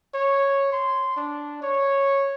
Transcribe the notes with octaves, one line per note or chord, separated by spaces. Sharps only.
C#5
C6
D4
C#5